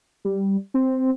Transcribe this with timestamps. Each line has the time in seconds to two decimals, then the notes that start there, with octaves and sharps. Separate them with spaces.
0.25 G3
0.74 C4